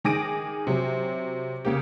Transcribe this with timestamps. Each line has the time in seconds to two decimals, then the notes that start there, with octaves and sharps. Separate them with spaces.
0.04 D#3 G#4 D6 A#6 D7 D#7
0.67 C3 F#3
1.65 C#3 A#3 G4